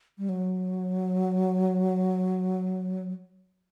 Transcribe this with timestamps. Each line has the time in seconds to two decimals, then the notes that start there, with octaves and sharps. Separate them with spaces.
0.18 G3
0.29 F#3